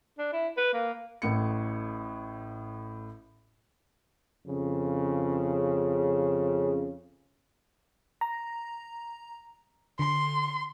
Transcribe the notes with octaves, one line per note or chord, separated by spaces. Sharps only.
D4
E4
B4
A#3
A1 A2 C#7
F2 C#3
A#5
D3 C6